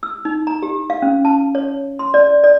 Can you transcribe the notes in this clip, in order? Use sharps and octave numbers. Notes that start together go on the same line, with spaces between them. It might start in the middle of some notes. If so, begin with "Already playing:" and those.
E6
D#4
A#5
G4
F5
C#4
A5
C#5
C6
D5
D5